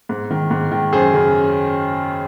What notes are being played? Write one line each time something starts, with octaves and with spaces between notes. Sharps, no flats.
G#2
D#3
G#2
D#3
F#2 G#4 C5
C#3